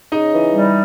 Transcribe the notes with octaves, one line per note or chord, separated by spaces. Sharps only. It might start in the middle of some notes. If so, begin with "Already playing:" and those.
C#3 D#4 D#5
E3
G3